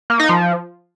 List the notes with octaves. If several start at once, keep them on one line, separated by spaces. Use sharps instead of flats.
A#3
D#4
F3